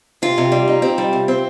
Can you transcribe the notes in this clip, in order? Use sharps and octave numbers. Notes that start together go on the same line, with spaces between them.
C3 F4
C3
G3
D#4
C4
G3
C3
C4